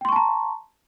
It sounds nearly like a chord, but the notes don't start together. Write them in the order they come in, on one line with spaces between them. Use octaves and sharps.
G5 C6 C#6 A5 A#5